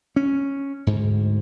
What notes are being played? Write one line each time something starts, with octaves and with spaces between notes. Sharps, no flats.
C#4
D2 G#2